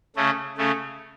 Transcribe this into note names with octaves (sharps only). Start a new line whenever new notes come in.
C#3 A3 C#4
C#3 A3 C#4